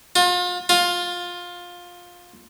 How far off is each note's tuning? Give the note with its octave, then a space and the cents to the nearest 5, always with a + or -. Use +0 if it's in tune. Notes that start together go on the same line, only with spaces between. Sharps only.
F4 +35
F4 +15